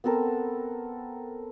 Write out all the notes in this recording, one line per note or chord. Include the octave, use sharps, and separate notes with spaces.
B3 C4 A4 A#4